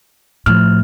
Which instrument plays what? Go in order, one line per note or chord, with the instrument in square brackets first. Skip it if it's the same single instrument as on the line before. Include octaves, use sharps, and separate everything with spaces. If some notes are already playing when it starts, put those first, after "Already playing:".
[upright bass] A2 [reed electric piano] F3 F6